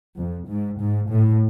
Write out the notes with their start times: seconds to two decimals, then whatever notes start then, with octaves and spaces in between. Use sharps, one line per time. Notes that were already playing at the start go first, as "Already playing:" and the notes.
0.17 F2
0.49 G#2
0.80 G#2
1.11 A2